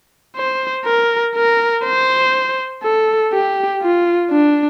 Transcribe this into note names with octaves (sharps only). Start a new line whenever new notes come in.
C5
A#4
A#4
C5
A4
G4
F4
D4